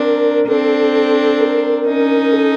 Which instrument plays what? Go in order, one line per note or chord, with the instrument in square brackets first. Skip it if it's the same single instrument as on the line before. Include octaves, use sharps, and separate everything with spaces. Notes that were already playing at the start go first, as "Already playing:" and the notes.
Already playing: [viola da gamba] C4 D4 [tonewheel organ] A#4
[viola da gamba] C4 D4 [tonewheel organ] A4
[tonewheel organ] A#4
[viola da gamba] C#4 D#4
[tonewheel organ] A4